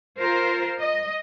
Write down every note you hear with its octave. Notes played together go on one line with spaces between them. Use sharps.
F4 A#4 C5
D#5